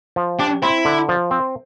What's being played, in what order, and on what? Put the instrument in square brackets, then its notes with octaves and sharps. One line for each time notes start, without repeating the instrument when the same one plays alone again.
[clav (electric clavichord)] F3
[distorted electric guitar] D4 [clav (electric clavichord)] G4
[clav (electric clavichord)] C4 [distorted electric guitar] E4
[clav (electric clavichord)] D3
F3
C4